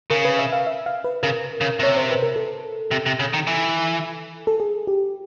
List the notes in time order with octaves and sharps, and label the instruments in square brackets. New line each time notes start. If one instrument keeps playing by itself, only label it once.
[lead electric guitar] C#3 [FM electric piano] A#4
[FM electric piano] B4
E5
F5
E5
F5
B4
[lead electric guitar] C#3 [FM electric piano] A#4
[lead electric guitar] C#3
[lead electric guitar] C3 [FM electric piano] C#5
[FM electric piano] C5
B4
A#4
A4
[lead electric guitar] C3
C3
C#3
D#3
E3
[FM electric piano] A4
G#4
G4